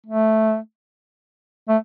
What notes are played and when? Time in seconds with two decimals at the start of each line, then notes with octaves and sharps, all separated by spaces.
0.06 A3
1.69 A3